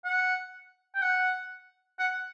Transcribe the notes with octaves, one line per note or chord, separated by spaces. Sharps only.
F#5
G5
F#5
F#5